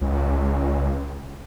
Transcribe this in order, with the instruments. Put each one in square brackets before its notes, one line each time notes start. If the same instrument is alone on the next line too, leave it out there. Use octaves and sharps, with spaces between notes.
[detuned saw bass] C#2